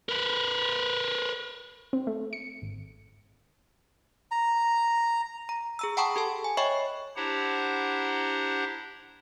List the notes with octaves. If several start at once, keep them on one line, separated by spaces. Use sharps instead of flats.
A#4 B4
C4
A3
C#7
G#1
A#5
A#5
G#4 A#5 E6
F#5 G5 A5 B5 C#6 D#6
G4 A4 A5
G#5
C#5 D#5 E5 G5 B5 C#6
D4 E4 G4 C5 F#5 A#5